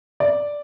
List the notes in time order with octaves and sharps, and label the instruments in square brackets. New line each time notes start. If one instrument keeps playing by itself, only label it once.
[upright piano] D5